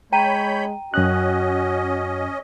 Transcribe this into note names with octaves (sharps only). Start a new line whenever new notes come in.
G#3 C#5 G5 A#5 B5 G6 D#7
F#2 C#4 F#4 D#5 F#6